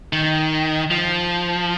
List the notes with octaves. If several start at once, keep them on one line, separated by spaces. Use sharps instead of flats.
D#3
F3